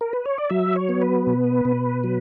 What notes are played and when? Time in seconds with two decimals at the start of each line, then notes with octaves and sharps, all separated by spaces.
0.01 A#4
0.13 B4
0.25 C#5
0.38 D5
0.50 F#3 E5
0.76 C#5
0.89 B3
1.02 B4
1.27 B2
1.65 B2
2.04 F#3